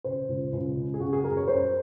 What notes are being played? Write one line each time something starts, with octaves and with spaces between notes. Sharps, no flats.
C#3 C5
C#2
C#2
C#3
G#4
C#3 F#4
G#4
F#2 A#4
C#5
F#2 C5